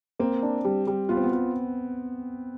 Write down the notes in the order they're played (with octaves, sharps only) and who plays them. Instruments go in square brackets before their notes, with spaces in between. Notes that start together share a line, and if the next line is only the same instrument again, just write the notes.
[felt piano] A#3 [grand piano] C4
[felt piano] D4
G3
G3
[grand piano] B3 [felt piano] F4
[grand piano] C4
B3
[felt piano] F4